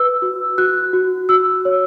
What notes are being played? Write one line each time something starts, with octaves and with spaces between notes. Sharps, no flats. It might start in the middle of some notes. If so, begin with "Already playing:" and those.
Already playing: B4 E6
F#4
F#4 F#6
F#4
F#4 E6
C#5